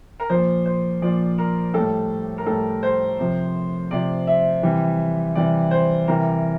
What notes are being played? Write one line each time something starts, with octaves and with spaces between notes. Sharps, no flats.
A#4
A#2 F3 C5
C5
A#2 F3 D5
A#4
A2 G3 A4
A#4
A2 G3 A4
C5
C3 F3
C3 F3 D5
E5
C3 E3 G3
C3 E3 G3 D5
C5
C3 E3 G3 A#4